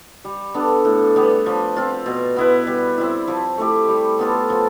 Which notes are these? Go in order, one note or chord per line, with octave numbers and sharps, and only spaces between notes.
G3
B3 D4 A4
A2
G3 B3
F3
C4 F4
B2
B3 E4 B4
G3
C4 E4
F3
A3 E4 G4
G3
B3 F4 A4
F3